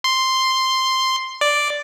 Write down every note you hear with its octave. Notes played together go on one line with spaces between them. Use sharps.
C6
D5